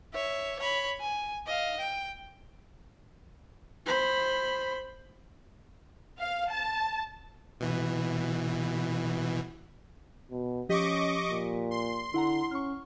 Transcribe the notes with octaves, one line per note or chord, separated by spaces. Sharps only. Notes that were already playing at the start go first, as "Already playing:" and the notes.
C#5 E5
C#5 B5
G#5
D#5 F5
G5
C5 B5
F5
A5
B2 E3
B2
F3 C#4 G4 D#5 C#6 D6 B6
A#2
C6
D3 E4 F#5 A#5
C#4 C#6 F6